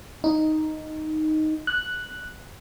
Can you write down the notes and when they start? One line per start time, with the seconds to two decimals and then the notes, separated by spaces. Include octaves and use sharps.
0.24 D#4
1.67 F#6